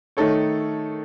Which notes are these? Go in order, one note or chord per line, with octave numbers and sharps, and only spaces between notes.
D#3 A3 D#4 A4 C#5